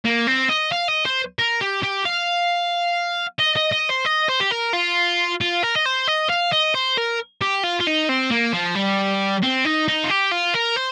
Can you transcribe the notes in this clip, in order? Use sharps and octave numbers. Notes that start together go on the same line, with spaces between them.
A#3
C4
D#5
F5
D#5
C5
A#4
G4
G4
F5
D#5
D#5
D#5
C5
D#5
C5
G4
A#4
F4
F4
A#4
D#5
C5
D#5
F5
D#5
C5
A#4
G4
F4
F4
D#4
C4
A#3
F3
G3
C4
D#4
D#4
F4
G4
F4
A#4
C5